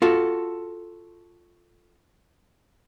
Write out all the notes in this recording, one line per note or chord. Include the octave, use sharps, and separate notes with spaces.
F4 F#4 A4